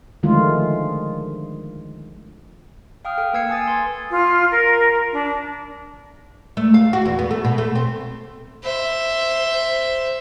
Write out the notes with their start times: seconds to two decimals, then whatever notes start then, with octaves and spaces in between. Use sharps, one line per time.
0.23 D3 D#3 F3 G#3 A3 F4
3.05 F5 G5 D#6 F6
3.18 A4 G5
3.33 A#3 B4 E6 G#6 C7 C#7
3.48 B4 G#5 D#6 A6
3.68 C6 G#6 A6
4.11 F4
4.51 A#4
5.13 D4
6.57 A3
6.74 F5
6.93 F#4
7.05 E2
7.19 B3
7.31 A3
7.45 B2
7.58 A3
7.75 C4
8.63 C5 E5